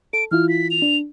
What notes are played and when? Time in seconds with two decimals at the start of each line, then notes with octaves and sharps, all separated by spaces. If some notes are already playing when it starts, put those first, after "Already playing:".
0.13 A4 D7
0.31 E3 E4 F4 F6
0.49 B6
0.71 F7
0.82 D4